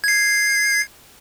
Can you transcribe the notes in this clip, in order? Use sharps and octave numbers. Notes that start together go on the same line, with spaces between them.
G#6 C7